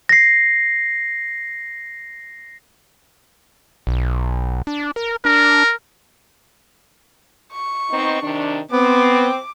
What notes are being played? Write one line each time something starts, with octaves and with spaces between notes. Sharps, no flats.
A#6 C7
B1
D4
A#4
D4 A#4
C#6
B3 C4 D#4
C3 D#3 D4
B3 C4 D6